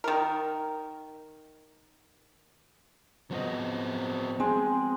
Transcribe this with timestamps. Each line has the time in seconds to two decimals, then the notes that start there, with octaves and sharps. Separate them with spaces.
0.04 D#3 A#4
3.31 F3 F#3 B3 C4 D#5
4.40 G#3 C4